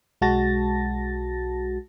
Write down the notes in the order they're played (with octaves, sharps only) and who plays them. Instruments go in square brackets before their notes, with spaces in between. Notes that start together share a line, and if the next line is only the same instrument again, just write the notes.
[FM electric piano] B1 G#3 F#4 A5 A6 A#6